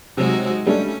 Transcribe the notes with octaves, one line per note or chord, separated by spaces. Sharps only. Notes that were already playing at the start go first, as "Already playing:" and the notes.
C3 F#3 G#3 D#4 F#4
G3 A3 C#4 D4